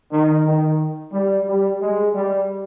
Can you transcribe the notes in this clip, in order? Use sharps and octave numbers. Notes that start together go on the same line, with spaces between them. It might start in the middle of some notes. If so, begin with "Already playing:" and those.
D#3
D#3
G3
G3
G#3
G3